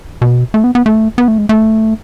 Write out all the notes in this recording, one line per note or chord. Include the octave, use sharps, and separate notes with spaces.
B2
A3
B3
B3
A3
B3
A3
G#3
A3